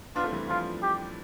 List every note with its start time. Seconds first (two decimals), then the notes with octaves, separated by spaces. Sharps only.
0.16 B3 D4 F4
0.24 A3 C4
0.32 E3 G3
0.49 F3 F4
0.83 G4